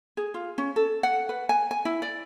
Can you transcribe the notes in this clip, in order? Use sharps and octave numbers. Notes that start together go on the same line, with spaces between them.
G#4
F4
C#4
A4
F#5
B4
G#5
G#5
E4
D5